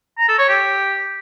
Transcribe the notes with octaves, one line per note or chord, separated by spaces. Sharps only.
A#5
A4
C#5
G4